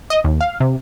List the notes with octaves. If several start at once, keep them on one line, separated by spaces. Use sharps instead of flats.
D#5
D#2
F5
C3